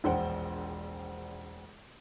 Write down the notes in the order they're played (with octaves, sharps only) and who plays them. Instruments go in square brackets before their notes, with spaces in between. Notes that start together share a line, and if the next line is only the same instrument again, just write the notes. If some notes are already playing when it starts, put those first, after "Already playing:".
[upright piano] E1 A#1 C5 F#5 G5